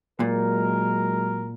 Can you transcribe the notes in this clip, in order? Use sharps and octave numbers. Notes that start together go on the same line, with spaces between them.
A#2 F#3 G#3 A#4